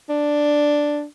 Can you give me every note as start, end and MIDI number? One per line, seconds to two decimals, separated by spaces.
0.09 1.05 62